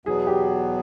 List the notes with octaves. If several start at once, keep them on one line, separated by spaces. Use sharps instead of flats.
E2 B2 F#3 B3 G#4
G4